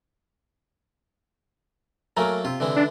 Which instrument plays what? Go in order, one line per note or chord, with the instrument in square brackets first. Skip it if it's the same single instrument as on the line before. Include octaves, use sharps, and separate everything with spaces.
[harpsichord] F#3 A3 A#3 [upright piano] A#4 G#5 A#5
[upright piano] C3 [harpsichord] F4
[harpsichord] D3 E3 G#3
[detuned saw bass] D4